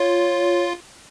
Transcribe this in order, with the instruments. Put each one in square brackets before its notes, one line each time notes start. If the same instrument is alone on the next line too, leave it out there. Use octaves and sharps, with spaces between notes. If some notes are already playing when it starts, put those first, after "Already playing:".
Already playing: [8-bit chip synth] F4 [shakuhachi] C#5